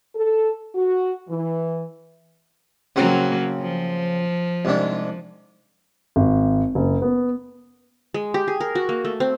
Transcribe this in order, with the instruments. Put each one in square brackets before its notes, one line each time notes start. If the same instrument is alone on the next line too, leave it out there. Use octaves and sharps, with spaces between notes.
[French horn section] A4
F#4
E3
[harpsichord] C#3 C4 F#4 [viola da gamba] F#3 A#3
[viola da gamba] F3
[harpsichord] C2 G#2 D4
[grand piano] G#1
F#1
B3
[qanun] G#3
G4
G#4
A#4
F#4
A#3
A3
C4